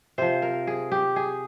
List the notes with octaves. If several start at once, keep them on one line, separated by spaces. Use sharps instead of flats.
C3 F3 C5
A#4
G#4
G4
G#4